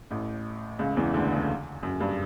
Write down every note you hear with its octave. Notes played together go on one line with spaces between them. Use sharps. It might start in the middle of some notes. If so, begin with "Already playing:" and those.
A1 A2
C#2 C#3
E2 E3
D2 D3
C#2 C#3
F#2
G2